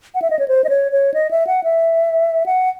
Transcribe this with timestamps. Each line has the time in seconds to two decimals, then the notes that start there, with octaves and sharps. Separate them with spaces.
0.15 F#5
0.22 E5
0.30 D#5
0.39 C#5
0.48 C5
0.64 D#5
0.69 C#5
0.92 C#5
1.14 D#5
1.31 E5
1.47 F#5
1.64 E5
2.46 F#5